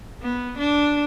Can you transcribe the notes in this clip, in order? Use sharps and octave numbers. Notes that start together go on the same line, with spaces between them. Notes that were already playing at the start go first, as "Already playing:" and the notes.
B3
D4